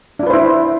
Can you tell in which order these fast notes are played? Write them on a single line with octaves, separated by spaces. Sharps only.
D4 F4 B4 C5 E4